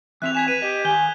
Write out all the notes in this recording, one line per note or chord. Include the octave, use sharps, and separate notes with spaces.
E3 C4 E5 F#6 F7
G#5 G#6 B6 E7
B4 D#7
G4 D#5
D#3 G#4 G#5 G6 G7